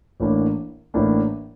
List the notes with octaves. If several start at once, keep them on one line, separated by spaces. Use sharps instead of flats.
A1 A2 E3 A#3 D4
A1 A2 E3 A#3 D4